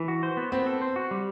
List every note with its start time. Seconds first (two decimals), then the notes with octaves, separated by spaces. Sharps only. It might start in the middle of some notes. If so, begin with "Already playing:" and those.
Already playing: E3
0.08 F#4
0.23 C5
0.37 B3
0.52 B3 C4
0.67 A4
0.82 C5
0.96 F#4
1.11 G3